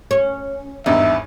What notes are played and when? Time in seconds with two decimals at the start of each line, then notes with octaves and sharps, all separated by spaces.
0.11 C#4
0.86 G#1 E2 G2 D#4 E5